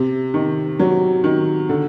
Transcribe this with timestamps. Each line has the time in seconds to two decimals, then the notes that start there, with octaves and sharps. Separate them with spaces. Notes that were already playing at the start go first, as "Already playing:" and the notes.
Already playing: C3
0.34 D#3
0.79 F#3
1.24 D#3
1.69 D3